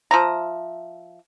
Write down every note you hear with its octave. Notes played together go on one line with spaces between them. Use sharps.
F3 E5 A#5